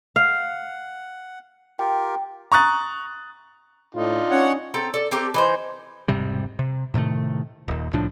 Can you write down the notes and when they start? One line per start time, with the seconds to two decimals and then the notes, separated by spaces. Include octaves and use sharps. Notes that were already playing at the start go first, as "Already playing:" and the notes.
0.16 F5 F#5
1.79 F4 G4 A#4 G5
2.52 A#5 C#6 D#6 F#6 A6
3.95 A2 D4 D#4 F4
4.31 C#4 C#5 F#5
4.74 C4 A4 G5 A#5
4.94 A4 D5
5.11 C4 G4 A4 A#4
5.34 E3 D#4 C5
6.08 E1 G#2 C3 G3
6.59 C3
6.94 A2 C3 D#3 A3
7.68 D#1 D#2
7.93 C2 A2 F3 D4